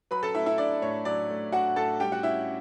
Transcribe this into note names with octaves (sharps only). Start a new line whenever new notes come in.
F#3 B4 B5
A4 A5
A3 E4 E5
E4 E5
D4 D5
A2 C#5
F#3 D5
A3
D4 F#4 F#5
A2 A4 A5
G3 G4 G5
F#4 F#5
C#4 E4 E5